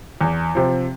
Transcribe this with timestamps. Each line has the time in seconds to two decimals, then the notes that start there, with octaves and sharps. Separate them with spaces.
0.21 E2
0.55 C3 F3